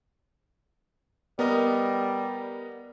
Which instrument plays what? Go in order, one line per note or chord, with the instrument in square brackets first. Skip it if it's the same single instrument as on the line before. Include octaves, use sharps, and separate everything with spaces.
[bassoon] G3 [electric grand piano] B3 A#4 D#5